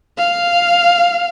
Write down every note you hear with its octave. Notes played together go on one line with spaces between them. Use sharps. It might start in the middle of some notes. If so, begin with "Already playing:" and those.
F5